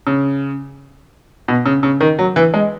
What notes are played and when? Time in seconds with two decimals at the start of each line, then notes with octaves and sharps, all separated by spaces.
0.07 C#3
1.48 B2
1.66 C#3
1.83 C#3
2.00 D#3
2.19 F#3
2.36 E3
2.54 G#3